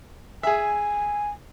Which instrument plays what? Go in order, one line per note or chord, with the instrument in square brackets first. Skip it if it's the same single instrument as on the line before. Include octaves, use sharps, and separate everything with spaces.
[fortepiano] G#4 E5 [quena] G#5